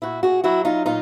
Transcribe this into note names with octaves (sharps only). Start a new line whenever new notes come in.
A#2 E4 F#4
F#4 G#4
F#3 E4 F#4
D#4 F4
A#2 D#4 F4